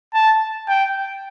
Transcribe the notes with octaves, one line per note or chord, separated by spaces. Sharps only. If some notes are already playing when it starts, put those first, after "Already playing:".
A5
G5